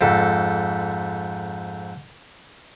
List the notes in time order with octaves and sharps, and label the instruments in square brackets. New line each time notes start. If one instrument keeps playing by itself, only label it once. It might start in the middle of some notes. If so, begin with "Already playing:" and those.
[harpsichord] F2 G#2 A4